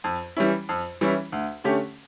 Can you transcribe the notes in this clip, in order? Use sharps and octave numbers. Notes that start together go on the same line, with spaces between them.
F2
E3 G3 C#4 E4
F2
E3 G3 C#4 E4
D2
D3 A3 C#4 G4